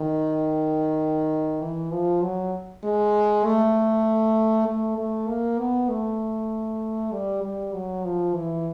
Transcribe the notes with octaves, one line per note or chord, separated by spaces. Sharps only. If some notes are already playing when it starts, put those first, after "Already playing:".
Already playing: D#3
E3
F3
F#3
G#3
A3
A3
A3
A#3
B3
A3
G3
G3
F#3
F3
E3